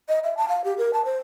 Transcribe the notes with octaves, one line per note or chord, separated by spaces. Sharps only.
D#5
E5
A5
F5
G4
A#4
A5
C5